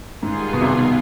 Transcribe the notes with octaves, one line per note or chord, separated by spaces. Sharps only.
G#2 D#3 G3 B3 F4 G#4
B2
C3
B2